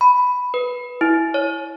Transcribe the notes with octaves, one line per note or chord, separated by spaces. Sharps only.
B5
B4
E4
C#5